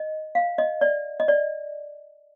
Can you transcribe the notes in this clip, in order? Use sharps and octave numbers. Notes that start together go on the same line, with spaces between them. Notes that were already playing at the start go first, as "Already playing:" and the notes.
Already playing: D#5
F5
D#5
D5
D#5
D5